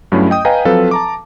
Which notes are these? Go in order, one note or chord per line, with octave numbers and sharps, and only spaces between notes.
G2 F#3 A3 C#4 E4
D#5 G5 D#6
B4 D#5 F5 G5 G#5 A#5
F3 F#3 C4 A4 B4 F5
A5 A#5 D6